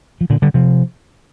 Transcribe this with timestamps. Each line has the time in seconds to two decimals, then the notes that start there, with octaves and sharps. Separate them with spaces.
0.21 F3
0.30 A#2 D3
0.42 D3 G3
0.54 C3 F3